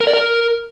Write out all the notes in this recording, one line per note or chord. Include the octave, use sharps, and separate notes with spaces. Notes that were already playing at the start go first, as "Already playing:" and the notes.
A#4
D5
A#4